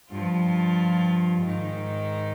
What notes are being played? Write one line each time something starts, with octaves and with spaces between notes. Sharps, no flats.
G2 F3 F4
G#2 D#3 D#4